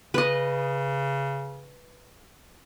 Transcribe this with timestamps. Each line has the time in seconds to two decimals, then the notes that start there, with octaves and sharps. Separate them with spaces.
0.14 C#3 B4 D#5